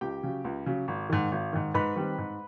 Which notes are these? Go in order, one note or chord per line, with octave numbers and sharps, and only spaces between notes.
C#2 G4 G5
C#3 F#3
C#2
C#3 F#3
G#1
G#2 D#3
G#1
G#2 D#3
G#2 B4 B5
D#3 G3 C4
G#2